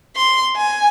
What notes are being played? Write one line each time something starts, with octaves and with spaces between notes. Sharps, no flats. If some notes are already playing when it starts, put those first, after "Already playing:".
C6
G#5